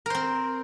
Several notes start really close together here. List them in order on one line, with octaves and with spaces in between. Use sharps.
A#4 C5 C4